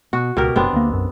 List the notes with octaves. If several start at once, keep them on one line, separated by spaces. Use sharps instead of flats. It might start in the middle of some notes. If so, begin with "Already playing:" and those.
B2 F#4
C#2 B2 G4 A#4
F#1 B3 C4 D4
D2 A#3
B1 F#2